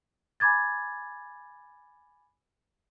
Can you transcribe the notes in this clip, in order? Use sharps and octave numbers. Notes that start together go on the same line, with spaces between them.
G#5 B5 D6 G#6 A6